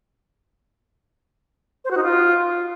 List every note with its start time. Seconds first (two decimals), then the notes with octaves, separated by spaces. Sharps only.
1.84 C5
1.90 F#4
1.97 D#4
2.03 F4